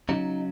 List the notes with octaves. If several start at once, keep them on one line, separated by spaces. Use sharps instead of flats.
C#3 F#3 D#4